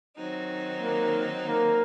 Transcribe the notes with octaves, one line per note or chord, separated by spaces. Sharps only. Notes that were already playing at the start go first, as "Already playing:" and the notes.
D#3 F#3 C4 D#4
A#3
A#3